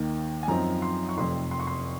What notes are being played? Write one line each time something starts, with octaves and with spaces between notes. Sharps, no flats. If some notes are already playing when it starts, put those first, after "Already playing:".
Already playing: D#2 D#3 A#3
G#5
F#2 F3 C4 D#4 A#5
C6
C#6
F1 F2 C3 C6
C6
C#6
C6